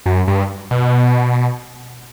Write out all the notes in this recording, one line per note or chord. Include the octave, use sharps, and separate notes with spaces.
F#2
G2
B2